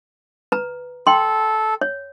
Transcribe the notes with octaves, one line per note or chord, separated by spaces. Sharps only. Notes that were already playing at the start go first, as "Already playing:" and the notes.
B4 A#5
A4 G5 C6
C#5